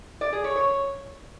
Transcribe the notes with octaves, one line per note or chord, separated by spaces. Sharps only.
D5
G#4
C#5
C#5